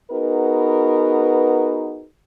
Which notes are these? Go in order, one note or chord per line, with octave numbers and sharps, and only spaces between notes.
B3 D#4 F#4 G#4 A#4 B4